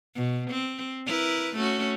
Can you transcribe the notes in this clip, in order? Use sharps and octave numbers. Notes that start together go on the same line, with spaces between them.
B2
C4
E4 A#4 B4
A3 C#4 F#4